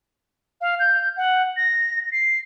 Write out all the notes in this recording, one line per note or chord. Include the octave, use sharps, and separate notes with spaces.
F5
G6
F#5
A#6
C7